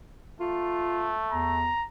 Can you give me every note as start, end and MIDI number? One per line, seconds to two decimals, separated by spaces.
0.40 1.60 57
0.40 1.14 65
1.32 1.72 40
1.32 1.87 82